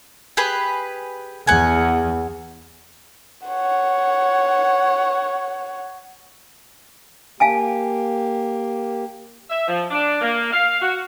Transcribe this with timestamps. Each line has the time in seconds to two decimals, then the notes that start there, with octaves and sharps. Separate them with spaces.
0.37 G4 G#4 B4
1.47 E2 F#5 G#5
3.47 C#5 F#5
7.40 A#3 G4 F5 G#5 A5
9.49 E5
9.67 F3
9.90 D4
10.21 A#3
10.52 F5
10.81 F#4